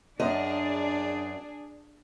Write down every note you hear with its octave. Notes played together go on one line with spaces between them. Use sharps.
F#2 D4 G#4 D#5